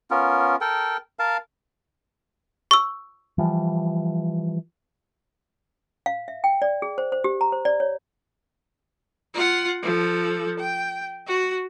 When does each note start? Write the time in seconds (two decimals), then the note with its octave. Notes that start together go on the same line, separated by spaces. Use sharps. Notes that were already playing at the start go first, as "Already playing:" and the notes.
0.10 B3 C#4 F4 A#4
0.61 A4 A#4 G5
1.19 A#4 F5 A5
2.71 C#6 E6
3.38 E3 F3 G3
6.06 F5
6.28 E5
6.44 G5
6.62 D5
6.82 G#4
6.98 C5
7.12 C5
7.24 G4
7.41 A#5
7.52 C5
7.65 D5
7.80 C#5
9.34 F4 F#5
9.83 F3 A4
10.59 G5
11.27 F#4